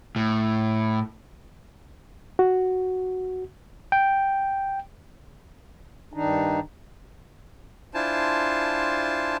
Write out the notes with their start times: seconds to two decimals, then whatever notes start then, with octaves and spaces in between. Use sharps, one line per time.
0.16 A2
2.39 F#4
3.92 G5
6.13 G2 D#3 D4 D#4
7.94 D4 E4 F4 C5 G#5 A5